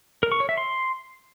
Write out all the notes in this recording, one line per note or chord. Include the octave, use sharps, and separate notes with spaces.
A#4
C#6
C#5
E5
C6